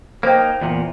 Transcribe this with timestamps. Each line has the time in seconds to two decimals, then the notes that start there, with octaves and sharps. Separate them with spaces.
0.23 A#3 B3 D#4 C5 G5
0.61 E2 A#2